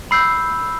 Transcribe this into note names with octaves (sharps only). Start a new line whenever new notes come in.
B5 E6 G6 C7